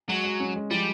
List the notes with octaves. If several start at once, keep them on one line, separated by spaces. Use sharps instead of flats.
F#3 G#3
G#3
C#4
G#3
F3 G3